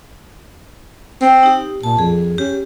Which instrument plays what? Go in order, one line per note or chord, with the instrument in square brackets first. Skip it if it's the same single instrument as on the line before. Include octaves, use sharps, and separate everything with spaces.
[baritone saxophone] C4
[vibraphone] D#4 G4
[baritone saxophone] A#2 [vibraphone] A5
[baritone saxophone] F2 [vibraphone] G#4
[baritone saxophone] C#4 [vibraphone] G4